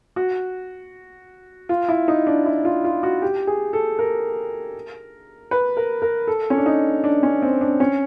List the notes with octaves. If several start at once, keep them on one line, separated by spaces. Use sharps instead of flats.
F#4
F4
E4
D#4
D4
E4
F4
F4
F#4
G4
G#4
A4
A#4
B4
A#4
A#4
A4
C#4
D4
D#4
D4
C#4
C4
D4
C#4